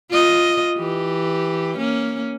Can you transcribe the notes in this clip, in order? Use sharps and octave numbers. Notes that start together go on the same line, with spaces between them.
F4 D#5
E3 G4
A#3 C#4